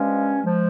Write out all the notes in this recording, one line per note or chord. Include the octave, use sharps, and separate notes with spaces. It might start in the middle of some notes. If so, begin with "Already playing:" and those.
Already playing: G2 F3 G#3 C#4
F3 G#3